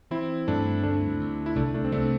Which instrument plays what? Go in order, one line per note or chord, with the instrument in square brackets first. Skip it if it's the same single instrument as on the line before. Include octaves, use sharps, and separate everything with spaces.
[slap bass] E3 [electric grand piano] C4 E4
[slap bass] G2 [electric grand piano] A3 D4
[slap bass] D2 [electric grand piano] A3 D4
[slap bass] D2
[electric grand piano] E4
[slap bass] C2 [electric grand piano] A3 D4
[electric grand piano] A3 D4
C4
[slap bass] C2 [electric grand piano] A3 D4